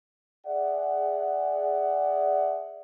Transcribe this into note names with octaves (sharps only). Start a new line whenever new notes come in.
G#4 D5 E5 F#5